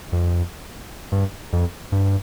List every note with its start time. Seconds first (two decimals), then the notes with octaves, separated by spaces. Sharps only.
0.12 F2
1.12 G2
1.53 F2
1.92 G2